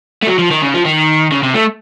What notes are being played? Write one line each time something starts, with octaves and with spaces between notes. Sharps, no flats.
A3
F#3
F3
D#3
C#3
F3
D#3
C#3
C3
A3